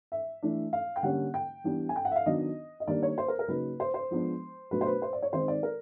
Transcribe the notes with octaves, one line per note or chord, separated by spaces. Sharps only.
E5
E3 A3 D4
F5
G5
D3 G3 A#3 C#4 F#5
G5
E3 G3 B3 D4
G#5
G5
F#5
E5
F5
D#3 F#3 B3 D4 D#5
D#5
D#3 G3 A#3 D4 D5
C#5
C5
A#4
A#4
C#3 F#3 A#3 D#4 B4
C5
C5
F3 G#3 B3 D4
B2 F#3 A3 D4 B4
C5
B4
C5
D5
C#5
D#3 G#3 C4 D#4 C5
D5
A#4